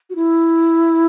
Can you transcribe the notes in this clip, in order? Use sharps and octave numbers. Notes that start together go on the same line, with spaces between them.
F#4
E4